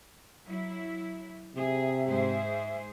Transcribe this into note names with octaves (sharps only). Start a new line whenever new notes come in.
F#3 E4
C3 G#4 E5
G#2 G#4 C5